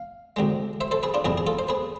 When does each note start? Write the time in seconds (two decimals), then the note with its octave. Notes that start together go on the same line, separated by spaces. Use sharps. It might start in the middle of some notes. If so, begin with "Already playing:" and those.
Already playing: F5
0.36 D2 C3 G#3
0.81 C5 E5
0.91 A4 C5
1.03 G#4 B4
1.14 D4 F4
1.25 F2 C3 E3 E4 G#4
1.38 G#4
1.47 F4 A4
1.59 C5
1.69 G#4 B4